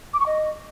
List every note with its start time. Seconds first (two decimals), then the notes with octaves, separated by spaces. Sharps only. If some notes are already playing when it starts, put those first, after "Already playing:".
0.14 D6
0.20 C#6
0.26 D#5